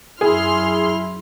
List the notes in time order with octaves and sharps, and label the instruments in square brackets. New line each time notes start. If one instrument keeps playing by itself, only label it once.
[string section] F#2 C6 F6 [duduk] E4 [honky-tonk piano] G#4